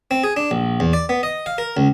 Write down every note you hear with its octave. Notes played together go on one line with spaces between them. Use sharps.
C4
G#4
D4
A#1
E2
D5
B3
D#5
F5
A#4
C#2